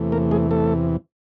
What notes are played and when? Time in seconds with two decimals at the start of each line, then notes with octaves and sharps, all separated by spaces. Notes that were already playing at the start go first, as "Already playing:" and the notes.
Already playing: E2 C3 E3 A3
0.12 A#3 A#4
0.31 G#3 G#4
0.51 A3 A4